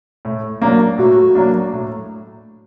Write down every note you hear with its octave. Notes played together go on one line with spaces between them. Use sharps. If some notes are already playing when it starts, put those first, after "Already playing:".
A2
F#3 A#3 D4
A2 F#4
F#3 A#3 D4
A2